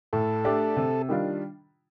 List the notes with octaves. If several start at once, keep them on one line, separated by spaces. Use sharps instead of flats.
A2 A4
A3 D4 G4 D5
C3
D#3 G3 D4 F4